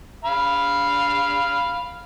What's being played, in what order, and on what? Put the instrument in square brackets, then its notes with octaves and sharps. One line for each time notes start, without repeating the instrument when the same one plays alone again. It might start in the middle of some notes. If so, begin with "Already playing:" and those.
[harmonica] F5 B5